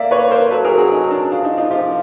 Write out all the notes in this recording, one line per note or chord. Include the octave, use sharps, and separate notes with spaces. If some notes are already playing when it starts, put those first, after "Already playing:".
Already playing: A#3 D5 E5
B4 C#5
A#4 C5
F#3 A4 B4
G#4 A#4
F#4 G#4
D#4
D4
F3 D4
D#4
D#4 F4
F3 F4 G4